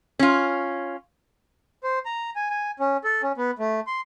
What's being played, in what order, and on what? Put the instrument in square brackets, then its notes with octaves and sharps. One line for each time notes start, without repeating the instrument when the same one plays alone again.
[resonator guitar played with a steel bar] C#4 F4
[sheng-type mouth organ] C5
A#5
G#5
G#5
C#4
A4
C#4
B3
A3
C6